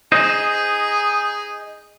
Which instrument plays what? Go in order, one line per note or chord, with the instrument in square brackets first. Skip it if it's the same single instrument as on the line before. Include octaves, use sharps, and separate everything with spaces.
[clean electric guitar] D#4 C5 D#5 [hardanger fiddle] G#4